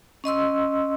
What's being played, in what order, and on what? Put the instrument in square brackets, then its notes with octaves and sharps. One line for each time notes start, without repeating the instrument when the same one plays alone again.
[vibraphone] C#4 D#5 C6 E6